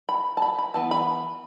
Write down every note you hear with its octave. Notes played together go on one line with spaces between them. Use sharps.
B5
A5
B5
B5
E3 B3 A5
B5